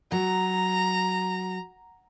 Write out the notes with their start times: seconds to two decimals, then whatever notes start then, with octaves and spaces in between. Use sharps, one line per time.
0.12 F#3 A#5